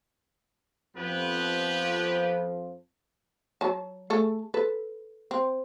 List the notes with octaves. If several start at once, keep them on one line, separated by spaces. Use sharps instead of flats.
F2 F3 B3 G4 B4
F#3 A5
A3 G#4 A4
A4 B4
C4